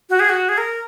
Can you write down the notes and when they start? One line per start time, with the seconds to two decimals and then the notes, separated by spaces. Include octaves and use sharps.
0.10 F#4
0.20 G#4
0.29 F#4
0.49 G#4
0.58 A#4